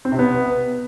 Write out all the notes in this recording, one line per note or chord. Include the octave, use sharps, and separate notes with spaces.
C4
C3
B3